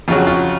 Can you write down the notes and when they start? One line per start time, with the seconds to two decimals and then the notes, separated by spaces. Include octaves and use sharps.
0.08 F2 C#3 F#3 F4
0.17 F#4
0.27 F4